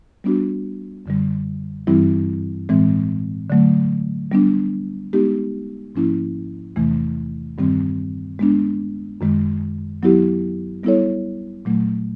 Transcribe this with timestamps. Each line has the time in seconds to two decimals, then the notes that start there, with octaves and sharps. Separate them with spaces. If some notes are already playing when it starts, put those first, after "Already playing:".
0.24 G3 B3 D4 F#4
1.06 F#2 D3 G3
1.87 G2 E3 G3 C4 E4
2.69 A2 E3 G#3 C4
3.50 D3 F#3 A3
4.32 G3 B3 D4
5.13 G#3 B3 D#4 G4
5.95 G#2 F3 A#3 C#4 E4
6.76 E2 C3 E3 A3
7.58 G2 D#3 G3 C4
8.39 G#3 B3 D4
9.21 F#2 D#3 G#3
10.03 F#3 B3 E4 G4
10.83 G3 B3 E4 A4 C#5
11.65 A#2 F#3 A3